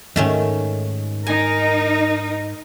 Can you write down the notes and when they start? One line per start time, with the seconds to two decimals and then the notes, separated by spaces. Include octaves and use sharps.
0.16 E2 G#2 D#3 A3 C#4
1.27 D#4 A#4 G#5